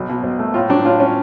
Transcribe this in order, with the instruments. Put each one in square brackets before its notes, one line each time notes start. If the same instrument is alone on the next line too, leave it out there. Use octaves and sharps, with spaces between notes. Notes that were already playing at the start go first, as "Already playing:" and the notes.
Already playing: [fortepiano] B1 F#3
B2
B1
A3
A2 F4
F#3 D4
A2 F4
C#4